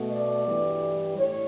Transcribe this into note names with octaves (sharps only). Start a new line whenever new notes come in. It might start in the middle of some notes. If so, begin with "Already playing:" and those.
Already playing: B2 A3
D5
G2 E3 G3
A2 C#5